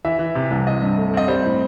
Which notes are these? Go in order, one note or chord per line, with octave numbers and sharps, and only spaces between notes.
E3 E5
E3
C3
C2
C4 D#5
G2
A3
C4 D#5
G3 C5
A2